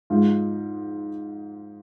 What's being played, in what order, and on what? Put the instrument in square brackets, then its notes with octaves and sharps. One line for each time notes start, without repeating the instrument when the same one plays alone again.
[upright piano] G#2 G#3 F4